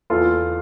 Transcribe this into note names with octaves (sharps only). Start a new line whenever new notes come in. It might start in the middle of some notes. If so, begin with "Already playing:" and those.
E2 F4 A4